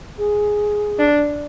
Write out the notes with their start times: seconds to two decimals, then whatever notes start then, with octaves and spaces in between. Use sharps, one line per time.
0.18 G#4
0.99 D4